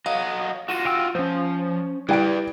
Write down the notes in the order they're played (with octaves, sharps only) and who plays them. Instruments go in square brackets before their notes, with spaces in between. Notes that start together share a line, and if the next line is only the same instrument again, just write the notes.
[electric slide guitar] F#3 D#5 [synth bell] F5
[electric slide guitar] F4 F#4 [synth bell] A#6 D#7 E7
[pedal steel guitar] F5 G5 E6
[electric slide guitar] F3 [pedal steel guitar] C#4 C5
[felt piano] G3 G5 D7 [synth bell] E4 [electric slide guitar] B4 D5